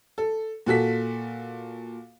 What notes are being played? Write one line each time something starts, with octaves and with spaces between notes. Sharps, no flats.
A4
A#2 F#4 A4 B6